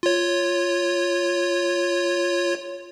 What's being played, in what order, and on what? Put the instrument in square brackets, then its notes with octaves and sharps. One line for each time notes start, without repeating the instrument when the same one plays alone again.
[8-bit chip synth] F4 C#5